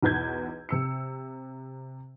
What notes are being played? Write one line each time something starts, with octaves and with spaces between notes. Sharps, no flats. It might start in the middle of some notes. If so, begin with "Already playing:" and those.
B1 E2 B4 G6 G#6
C3 E6 C#7